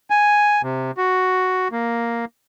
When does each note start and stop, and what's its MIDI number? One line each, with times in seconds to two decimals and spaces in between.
0.10 0.62 80
0.63 0.91 48
0.97 1.68 66
1.72 2.25 58